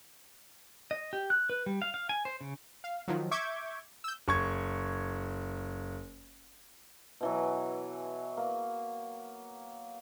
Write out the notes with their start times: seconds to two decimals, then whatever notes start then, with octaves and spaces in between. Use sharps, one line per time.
0.91 D#5
1.13 G4
1.30 F#6
1.50 B4
1.66 G3
1.82 F5
1.94 F5
2.09 G#5
2.25 C5
2.41 C#3
2.84 F5
3.08 D#3 F3 F#3
3.31 E5 C#6 D6 G6 G#6
4.04 E6 G6
4.28 F#1 C#6 G#6
7.21 B2 E3 F#3
8.37 A#3